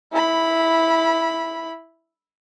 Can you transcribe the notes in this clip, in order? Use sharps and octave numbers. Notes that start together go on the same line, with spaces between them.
E4 B5